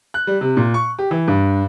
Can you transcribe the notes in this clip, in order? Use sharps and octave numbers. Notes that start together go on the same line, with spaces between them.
F#6
G3
C3
A#2
C#6
G4
E3
G2